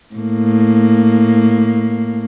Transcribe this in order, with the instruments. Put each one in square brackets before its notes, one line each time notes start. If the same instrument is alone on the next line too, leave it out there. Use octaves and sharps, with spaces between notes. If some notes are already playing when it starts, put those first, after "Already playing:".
[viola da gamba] A2 A#3